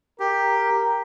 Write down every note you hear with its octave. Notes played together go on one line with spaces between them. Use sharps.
G4 A#4